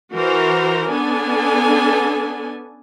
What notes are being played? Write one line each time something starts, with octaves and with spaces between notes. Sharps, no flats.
E3 F#4 A#4 C5 A#5
B3 C#4 D4 A4 G#5